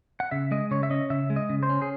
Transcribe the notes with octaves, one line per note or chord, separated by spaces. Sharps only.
F#5
C#3 E5
G#3 D#5
C#3 C#5
E5
C#4 D#5
C#3 E5
G#3
D#5
C#3
C5
C#4
G#4